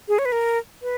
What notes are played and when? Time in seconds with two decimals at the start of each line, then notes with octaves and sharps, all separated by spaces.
0.08 G#4
0.19 C#5
0.25 B4
0.32 A#4
0.82 B4